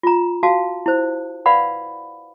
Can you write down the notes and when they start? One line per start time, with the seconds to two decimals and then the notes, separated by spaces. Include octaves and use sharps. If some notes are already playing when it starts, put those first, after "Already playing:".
0.03 F4 A#5
0.43 F#4 F5 A5
0.86 E4 C5
1.46 B4 D5 F5 F#5 B5